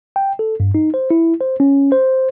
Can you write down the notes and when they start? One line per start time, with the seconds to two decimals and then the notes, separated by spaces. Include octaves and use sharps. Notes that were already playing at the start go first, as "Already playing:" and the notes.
0.16 G5
0.39 A4
0.60 G2
0.75 D#4
0.94 C5
1.11 E4
1.41 C5
1.60 C#4
1.92 C5